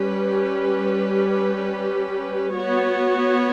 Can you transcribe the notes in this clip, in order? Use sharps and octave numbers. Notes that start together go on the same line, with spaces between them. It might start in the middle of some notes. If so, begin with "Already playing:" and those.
Already playing: G3 C#4 G4 B4
B3 F#4 C#5